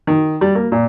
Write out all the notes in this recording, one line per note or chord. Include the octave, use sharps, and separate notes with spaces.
D#3
G3
A#3
A#2